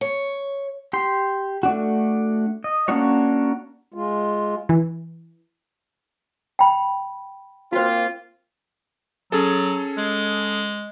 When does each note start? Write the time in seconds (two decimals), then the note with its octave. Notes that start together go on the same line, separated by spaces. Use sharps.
0.01 C#5
0.93 G4 C6
1.63 A3 D4 F#4
2.64 D#5
2.88 A#3 C#4 D4 F#4 C#5
3.94 G#3 F4
4.69 E3
6.59 G5 B5
7.73 A#3 C4 F4 F#4 C5
9.32 F#3 C#4 G#4 A4
9.97 G#3